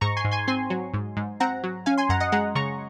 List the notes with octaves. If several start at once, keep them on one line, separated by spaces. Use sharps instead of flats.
G#2 A#5 C#6
G#5 C6
G#2
G#5 C6
C4 G#5 C6
F#3
G#2
G#2
C4 F#5 A#5
F#3
C#4 F5 G#5
G#5 C6
F#2 F#5 A#5
D#5 F#5
G#3 F#5 A#5
C#3 A#5 C#6